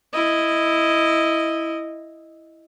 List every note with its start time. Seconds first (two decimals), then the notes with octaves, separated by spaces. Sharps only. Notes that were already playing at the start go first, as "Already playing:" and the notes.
0.13 E4 D#5